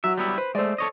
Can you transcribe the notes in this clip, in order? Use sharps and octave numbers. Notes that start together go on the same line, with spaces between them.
F#3 E5
G3 B3 E4
B4 C5
G#3 A3 C5 D5
A4 C#5 D#5